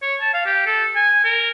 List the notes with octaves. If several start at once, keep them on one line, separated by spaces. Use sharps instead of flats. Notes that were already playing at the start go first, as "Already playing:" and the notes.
C#5
A5
F5
G4
A4
G#5
A#4